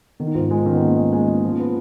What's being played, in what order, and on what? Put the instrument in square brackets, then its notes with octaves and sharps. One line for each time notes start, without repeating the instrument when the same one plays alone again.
[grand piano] D#3 [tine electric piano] B3
[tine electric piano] D#4
[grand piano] G#2 [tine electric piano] F4
[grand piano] G#3 [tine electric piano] F4
[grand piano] D#3 [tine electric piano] C#4
[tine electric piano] B3
[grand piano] G#3 [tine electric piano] A#3
[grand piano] G#3
G#3
G#3
F3
B3